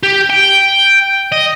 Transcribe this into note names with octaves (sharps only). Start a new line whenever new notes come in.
G4
G5
D#5